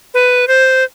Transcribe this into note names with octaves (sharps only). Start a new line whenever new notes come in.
B4
C5